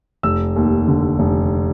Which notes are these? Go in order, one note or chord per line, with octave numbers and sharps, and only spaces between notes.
F1 E6
D#2
D3
F1